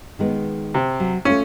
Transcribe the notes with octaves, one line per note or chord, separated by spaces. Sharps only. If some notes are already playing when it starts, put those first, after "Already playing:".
D#3 G#3 B3
C3
F#3
A3 C#4 F4